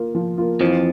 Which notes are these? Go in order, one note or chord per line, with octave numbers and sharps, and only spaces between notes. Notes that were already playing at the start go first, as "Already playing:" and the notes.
Already playing: A#3 F4
F3
A#3 F4
F2 E3 F3